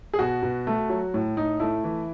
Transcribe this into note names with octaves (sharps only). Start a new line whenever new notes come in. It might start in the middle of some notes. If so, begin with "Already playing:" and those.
G#4
B2 F#4
B2
A3
F#3
A2
A2 D#4
A3 E4
E3